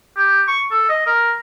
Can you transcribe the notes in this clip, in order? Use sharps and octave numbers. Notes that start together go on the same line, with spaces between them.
G4
C#6
A4
D#5
A#4